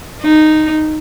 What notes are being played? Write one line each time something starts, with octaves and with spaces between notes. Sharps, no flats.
D#4